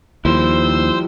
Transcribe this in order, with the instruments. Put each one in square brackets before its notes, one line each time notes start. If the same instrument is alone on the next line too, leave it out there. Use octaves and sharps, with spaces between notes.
[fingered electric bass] D#2 [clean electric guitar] F3 G3 E4 [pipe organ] C5 C6 E6